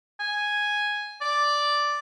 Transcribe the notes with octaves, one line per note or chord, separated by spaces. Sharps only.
G#5
D5